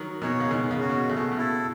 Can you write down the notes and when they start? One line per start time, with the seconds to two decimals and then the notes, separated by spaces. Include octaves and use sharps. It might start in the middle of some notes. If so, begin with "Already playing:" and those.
Already playing: D#3 F#3
0.22 B2 D#3 D#4 G#4 C#5
0.40 C#3
0.51 B2 D#3 G#3
0.71 C#3
0.80 C#4 F#4
0.89 B2
1.09 C#3 A3
1.17 B2
1.32 B2
1.38 E4 A4